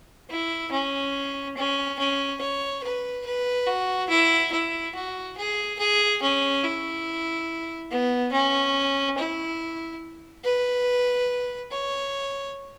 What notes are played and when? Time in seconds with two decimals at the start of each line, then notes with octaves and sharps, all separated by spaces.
0.30 E4
0.71 C#4
1.56 C#4
1.98 C#4
2.41 C#5
2.83 B4
3.26 B4
3.67 F#4
4.09 E4
4.52 E4
4.95 F#4
5.37 G#4
5.79 G#4
6.22 C#4
6.63 E4
7.91 B3
8.32 C#4
9.18 E4
10.44 B4
11.72 C#5